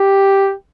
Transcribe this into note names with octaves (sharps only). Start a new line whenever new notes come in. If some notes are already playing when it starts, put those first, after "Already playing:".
Already playing: G4